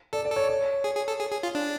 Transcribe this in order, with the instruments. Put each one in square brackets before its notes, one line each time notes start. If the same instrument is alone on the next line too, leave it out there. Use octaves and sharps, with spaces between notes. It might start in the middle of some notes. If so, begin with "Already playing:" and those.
[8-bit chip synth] A4 [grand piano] D5
[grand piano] D5
[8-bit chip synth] A4
[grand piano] C#5
C#5
[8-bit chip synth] G#4
G#4
A4
G#4
G#4
F4
D4